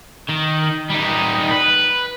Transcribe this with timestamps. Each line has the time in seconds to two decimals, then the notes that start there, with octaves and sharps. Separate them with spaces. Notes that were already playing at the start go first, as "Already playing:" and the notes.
0.29 D#3
0.90 G3 D#4
1.51 B4